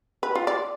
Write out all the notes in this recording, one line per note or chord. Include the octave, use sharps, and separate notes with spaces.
B4
F4
D5